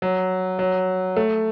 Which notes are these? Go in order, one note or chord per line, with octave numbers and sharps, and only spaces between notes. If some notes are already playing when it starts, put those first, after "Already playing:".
F#3
F#3
A3